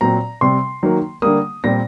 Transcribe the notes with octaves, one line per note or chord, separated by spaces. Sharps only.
A#2 F#3 C4 A#5
C3 G3 C4 C6
D#3 F#3 A#3
D3 G3 A#3 D#6
A#2 G3 C4 A#6